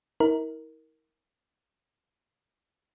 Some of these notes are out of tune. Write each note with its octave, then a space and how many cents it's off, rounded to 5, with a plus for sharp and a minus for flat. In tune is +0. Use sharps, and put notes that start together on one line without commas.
E4 -45 A#4 +0